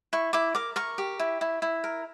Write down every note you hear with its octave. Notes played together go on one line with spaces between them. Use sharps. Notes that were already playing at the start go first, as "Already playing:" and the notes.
E4 C#6
E4 D6
A#4 D6
A#4 C#6
G4
E4
E4
E4
A#4